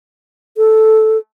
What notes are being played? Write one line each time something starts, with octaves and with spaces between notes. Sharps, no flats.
A4